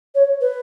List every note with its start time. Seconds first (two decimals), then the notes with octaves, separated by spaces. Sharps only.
0.15 C#5
0.41 B4